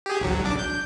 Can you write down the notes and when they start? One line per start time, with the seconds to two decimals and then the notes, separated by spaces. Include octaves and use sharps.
0.06 G4 G#4
0.20 A1 D2 F#3
0.44 C2 D4 D6
0.59 G6